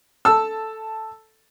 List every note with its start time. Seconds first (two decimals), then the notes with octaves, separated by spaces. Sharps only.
0.25 A4 A5 E6